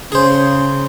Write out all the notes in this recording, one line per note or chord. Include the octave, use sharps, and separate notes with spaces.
C#3 G#4 C5